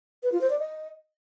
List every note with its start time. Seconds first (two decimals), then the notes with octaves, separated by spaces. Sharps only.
0.23 B4
0.32 F4
0.41 C5
0.50 D5
0.59 D#5